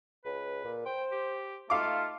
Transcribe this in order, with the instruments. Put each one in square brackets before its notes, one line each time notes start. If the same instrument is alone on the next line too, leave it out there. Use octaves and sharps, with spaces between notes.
[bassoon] C#2 [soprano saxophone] B4
[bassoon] A#2
[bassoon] C5 [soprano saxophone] G5
[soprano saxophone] G4
[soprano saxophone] A3 [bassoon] D#4 [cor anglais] F4 [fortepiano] F5 D6